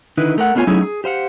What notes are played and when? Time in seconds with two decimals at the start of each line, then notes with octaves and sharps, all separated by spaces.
0.17 D3 D#3 D#4 E4 B4
0.38 A3 A#4 F#5
0.55 A3 B3 D4 F4 C#5 G#5
0.67 F#3 A3 C#4 D#4 E4 G#4
0.82 G#4
1.04 G4 C5 F5 F#5